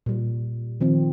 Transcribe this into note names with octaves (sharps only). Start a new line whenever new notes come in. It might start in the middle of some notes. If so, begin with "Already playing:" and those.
A#2 G3
D#3 F3 C4